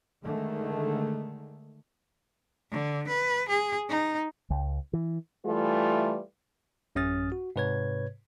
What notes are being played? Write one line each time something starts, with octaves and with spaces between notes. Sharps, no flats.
D3 D#3 G#3 A3
D3
B4
G#4
D#4
C#2
E3
E3 G3 A3 F4 B4
A1 F#2 C#4 D#6 F6 A6
F#4
G#2 C3 B4 C#5 G#6